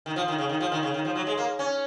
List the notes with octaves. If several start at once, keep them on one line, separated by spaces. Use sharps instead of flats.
D#3
F3
D#3
C#3
D#3
F3
D#3
C#3
D#3
F3
F#3
G#3
A#3
C#4